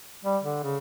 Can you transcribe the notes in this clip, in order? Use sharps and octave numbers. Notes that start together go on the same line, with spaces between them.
G3
D3
C#3